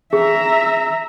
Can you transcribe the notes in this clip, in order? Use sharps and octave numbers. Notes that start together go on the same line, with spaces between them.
G#4 E5 A#5